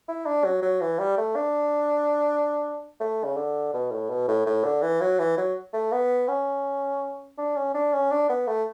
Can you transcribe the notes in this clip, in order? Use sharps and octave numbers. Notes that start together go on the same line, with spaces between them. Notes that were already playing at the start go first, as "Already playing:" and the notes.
E4
D4
F#3
F#3
E3
G3
A3
D4
A3
C#3
D3
B2
A2
B2
A2
A2
D3
E3
F#3
E3
F#3
A3
B3
C#4
D4
C#4
D4
C#4
D4
B3
A3